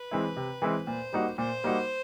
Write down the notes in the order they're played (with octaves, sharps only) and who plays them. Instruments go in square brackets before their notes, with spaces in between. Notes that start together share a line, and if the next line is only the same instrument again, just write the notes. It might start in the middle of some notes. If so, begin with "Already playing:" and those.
Already playing: [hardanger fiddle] B4
[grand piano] E3 G#3 C4 E4
C3
E3 G#3 C4 E4
[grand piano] A#2 [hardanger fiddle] C5
[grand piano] G3 A#3 D#4 F#4
[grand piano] A#2 [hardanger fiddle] C5
[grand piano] G3 A#3 D#4 F#4